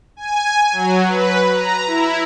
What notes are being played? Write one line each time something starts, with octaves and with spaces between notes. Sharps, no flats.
G#5
F#3
B4
A#5
E4